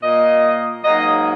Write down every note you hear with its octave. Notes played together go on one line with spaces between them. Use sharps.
A#2 A#3 D#5
G#2 F#3 A#3 D#5